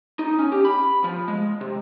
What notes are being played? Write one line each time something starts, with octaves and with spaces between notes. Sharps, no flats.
D#4
C#4
G4
B5
F3
G#3
C3